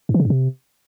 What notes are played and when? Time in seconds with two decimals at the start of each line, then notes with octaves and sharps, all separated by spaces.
0.09 G#2
0.14 E3
0.20 C#3
0.25 G2
0.30 C3